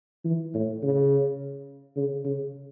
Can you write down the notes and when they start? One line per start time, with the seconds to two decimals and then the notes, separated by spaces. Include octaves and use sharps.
0.25 E3
0.54 A2
0.83 C#3
1.97 C#3
2.24 C#3